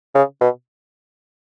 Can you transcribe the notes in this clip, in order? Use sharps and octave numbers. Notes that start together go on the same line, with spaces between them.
C#3
B2